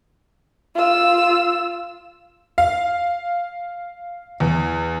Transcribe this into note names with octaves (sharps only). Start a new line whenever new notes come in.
F4 E6
F5
E2